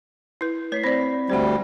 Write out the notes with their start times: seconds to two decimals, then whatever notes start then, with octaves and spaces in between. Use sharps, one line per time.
0.41 E4 B4
0.72 A3 B4 C#5 B6 C7
0.84 C4 C5 D5 B5 A#6
1.30 D2 G3 C5 F#5